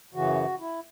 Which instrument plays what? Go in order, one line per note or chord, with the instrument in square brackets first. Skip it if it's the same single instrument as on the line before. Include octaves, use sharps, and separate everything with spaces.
[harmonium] F#2 C#3 E3 F#4
E4